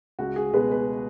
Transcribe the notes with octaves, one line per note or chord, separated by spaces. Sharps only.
C#2 F#4
G#4
B2 G#3 B4
B4